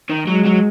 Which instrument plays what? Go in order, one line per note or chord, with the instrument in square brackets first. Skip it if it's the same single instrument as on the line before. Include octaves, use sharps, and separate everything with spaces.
[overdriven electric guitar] D#3
[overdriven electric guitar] F#3 [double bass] G#3
[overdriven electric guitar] F#3